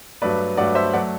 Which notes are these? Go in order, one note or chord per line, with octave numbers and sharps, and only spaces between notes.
G2 F#3 A3 B4 D5
G2 F#3 A3 D5 F#5
C5 E5
F#3 A3 D5 F#5